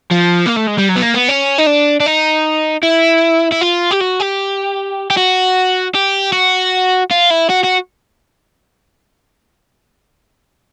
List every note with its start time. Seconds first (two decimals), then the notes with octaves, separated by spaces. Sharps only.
0.11 F3
0.46 A#3
0.56 A3
0.67 G#3
0.78 G3
0.89 F#3
0.96 B3
1.02 A#3
1.14 B3
1.28 C#4
1.58 D#4
1.66 D4
2.00 D4
2.06 D#4
2.83 E4
3.52 E4
3.61 F4
3.91 G4
4.00 F#4
4.20 G4
5.10 G4
5.17 F#4
5.95 G4
6.33 F#4
7.11 F4
7.31 E4
7.49 F#4
7.63 F#4